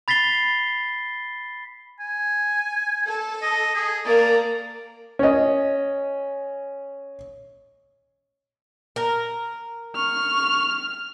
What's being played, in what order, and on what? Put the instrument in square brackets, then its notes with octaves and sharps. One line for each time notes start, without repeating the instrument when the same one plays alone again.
[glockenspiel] B5 A6 B6 C7 G7
[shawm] G#5
[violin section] A4
[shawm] D#5
G#4
[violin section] A#3 A#4 [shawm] D5
[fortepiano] C#4 D#5
[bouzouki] A#4
[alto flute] C#6 [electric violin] F6